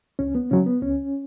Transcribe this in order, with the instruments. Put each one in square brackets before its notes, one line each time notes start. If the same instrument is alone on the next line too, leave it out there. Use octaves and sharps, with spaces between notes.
[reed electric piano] C#2 C#4
B3
C#3 F#3 C#4
B3
C#2 C#4